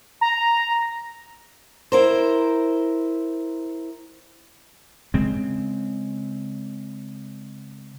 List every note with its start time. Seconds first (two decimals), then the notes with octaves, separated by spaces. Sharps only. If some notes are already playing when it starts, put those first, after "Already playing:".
0.21 A#5
1.92 E4 A#4 C5
5.14 C#3 G#3 C4